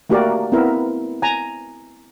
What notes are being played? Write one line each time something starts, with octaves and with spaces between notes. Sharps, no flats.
A3 A#3 F#4 G4 A#4 D5
B3 C4 E4 A#4 E5
G#5 A#5